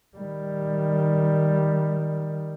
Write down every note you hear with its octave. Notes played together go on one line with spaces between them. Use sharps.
D#3 G3